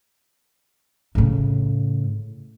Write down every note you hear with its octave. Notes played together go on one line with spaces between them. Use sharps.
A2 C#3